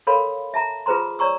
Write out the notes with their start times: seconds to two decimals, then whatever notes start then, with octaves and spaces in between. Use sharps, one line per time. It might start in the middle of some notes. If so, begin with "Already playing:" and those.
0.07 A4 A#4 C#5 F5 B5 C6
0.54 E5 A5 A#5
0.86 F4 G#4 B4 C5 A#5 C6
1.19 C#5 D5 A#5 C#6 E6